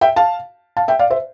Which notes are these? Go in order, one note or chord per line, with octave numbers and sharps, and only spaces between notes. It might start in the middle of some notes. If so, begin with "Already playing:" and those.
E5 G5
F5 A5
F5 A5
E5 G5
D5 F5
C5 E5